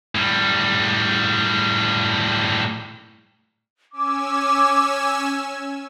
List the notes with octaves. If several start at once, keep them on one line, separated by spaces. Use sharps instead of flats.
A2 G3
C#4 G#5 D6 E6